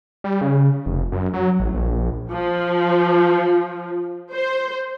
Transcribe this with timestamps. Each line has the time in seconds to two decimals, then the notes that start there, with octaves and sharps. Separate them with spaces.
0.24 G3
0.41 C#3
0.86 F1
1.12 F#2
1.33 F#3
1.60 A1
1.74 A#1
2.30 F3
4.32 C5